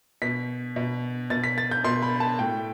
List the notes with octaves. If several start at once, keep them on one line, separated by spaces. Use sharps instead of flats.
B2 B6
B2
B2 A6
B6
A6
G6
B2 C6
B5
A5
A2 G5